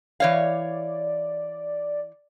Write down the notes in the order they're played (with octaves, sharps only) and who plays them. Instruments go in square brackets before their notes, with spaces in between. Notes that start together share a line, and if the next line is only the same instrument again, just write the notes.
[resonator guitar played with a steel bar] E3 C#5 F5 [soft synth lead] D5